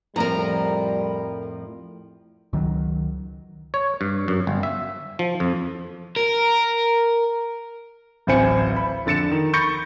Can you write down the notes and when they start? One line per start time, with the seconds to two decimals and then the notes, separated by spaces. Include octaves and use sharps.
0.16 F2 A2 F3 G3 A#4 A#5
2.53 C#2 D#3 E3 F#3
3.74 C#5
4.01 G2
4.28 F#2
4.47 G1
4.63 E5
5.19 F3
5.40 F2
6.16 A#4
8.27 D1 A1 C4 C5 G#5 C#7
8.76 B5
9.06 F2 D3 A6 C#7 E7
9.31 D#3
9.53 B5 C#6 G6 A6 A#6 C#7